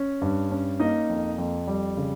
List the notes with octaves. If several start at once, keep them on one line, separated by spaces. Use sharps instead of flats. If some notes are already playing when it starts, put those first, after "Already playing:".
Already playing: C#4
G2
C#4
A#3 D#4 D#5
F2
F2
G3
C#3